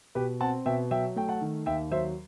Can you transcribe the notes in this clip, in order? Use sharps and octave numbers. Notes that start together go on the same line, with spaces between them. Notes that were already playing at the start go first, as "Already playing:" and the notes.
B2 G4 B4
C4 F#5 A5
B2 E5 G5
F#3 E5 G5
A3 G5
F#5 A5
D#3
D#2 E5 G5
F#3 C5 E5